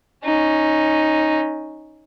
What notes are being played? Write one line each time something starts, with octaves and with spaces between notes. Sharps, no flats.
C#4 D#4